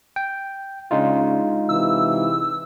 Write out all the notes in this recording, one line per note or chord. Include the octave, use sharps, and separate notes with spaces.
G5
C#3 G#3 D4 D#4 F4
C3 E3 E4 E6